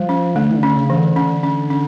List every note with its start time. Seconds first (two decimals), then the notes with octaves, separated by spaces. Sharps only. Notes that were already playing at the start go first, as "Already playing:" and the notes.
Already playing: F3 G3
0.09 C#4
0.35 D3 A3
0.51 E3
0.56 D3
0.63 C#4
0.76 C#3
0.90 E3
0.97 D3
1.16 D3 C#4
1.43 C#4
1.70 C#4